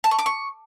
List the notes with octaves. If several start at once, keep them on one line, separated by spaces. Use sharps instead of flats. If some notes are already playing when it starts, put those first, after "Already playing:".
A5
C#6
D6
C#6